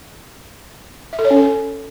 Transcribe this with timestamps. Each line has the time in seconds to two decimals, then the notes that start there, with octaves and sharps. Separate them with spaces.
1.13 E5
1.19 A4
1.25 C#5
1.31 C#4
1.37 A4